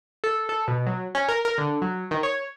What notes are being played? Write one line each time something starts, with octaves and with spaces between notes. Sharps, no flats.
A4
A4
B2
F#3
C#4
A#4
A#4
D3
F#3
D#3
C#5